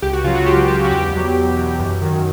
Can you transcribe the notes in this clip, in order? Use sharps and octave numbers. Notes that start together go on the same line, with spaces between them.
C#2 G4
F#4
C#3 F#3 F4
F#4
C#2 G4
C#3 F#3 G4
F#4
E2 G4
B2 F#3
E2
B2 F#3
F#2
D#3 F#3